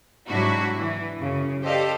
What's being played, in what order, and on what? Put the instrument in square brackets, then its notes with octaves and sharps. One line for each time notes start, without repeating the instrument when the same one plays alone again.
[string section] G#2 C3 F#3 D4 E4 F#4
E3
F#2 C#3
G4 A4 C5 D5 D#5 F5